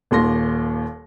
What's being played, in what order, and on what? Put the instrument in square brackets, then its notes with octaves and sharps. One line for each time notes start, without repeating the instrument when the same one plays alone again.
[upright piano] D#1 D#2 C6 A#6